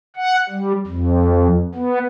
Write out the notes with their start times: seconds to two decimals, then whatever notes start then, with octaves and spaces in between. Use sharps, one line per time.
0.16 F#5
0.49 G3
0.87 F2
1.75 B3